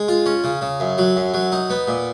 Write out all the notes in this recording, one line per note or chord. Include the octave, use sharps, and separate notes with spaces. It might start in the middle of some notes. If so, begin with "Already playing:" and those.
Already playing: G#3
F4
C#4
C#3
C#3
F#2
F#3
F#2
F#3
D#4
B3
A#2